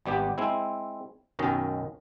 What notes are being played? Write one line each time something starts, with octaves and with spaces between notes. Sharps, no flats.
G#1 G3 B3 G4
G#3 C4 E4
B1 F#2 D#3 C#4 D#5